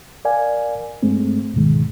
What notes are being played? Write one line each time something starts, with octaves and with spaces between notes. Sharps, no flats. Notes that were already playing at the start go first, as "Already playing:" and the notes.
A#4 D5 F5 G#5
G2 G#3 A3 C4
D2 G#2 B2 D#3 G#3